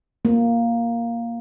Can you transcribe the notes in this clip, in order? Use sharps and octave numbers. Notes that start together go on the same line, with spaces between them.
A#3